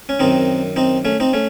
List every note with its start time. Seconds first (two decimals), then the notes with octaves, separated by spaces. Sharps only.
0.09 C#4
0.20 F#2 D#3 C4 D#4
0.76 C4 D#4
1.05 A3 C#4
1.20 C4 D#4
1.33 A3 C#4